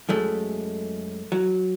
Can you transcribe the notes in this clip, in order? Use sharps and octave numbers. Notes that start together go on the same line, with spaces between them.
F#2 G#3 A3
F#3